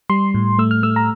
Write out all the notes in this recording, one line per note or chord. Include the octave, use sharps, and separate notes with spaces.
G3 C6
A2
A3 E6
F6
A3 E6
A#5